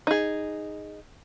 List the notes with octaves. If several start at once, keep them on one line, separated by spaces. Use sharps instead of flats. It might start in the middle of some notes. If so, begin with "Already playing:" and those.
D#4 G#4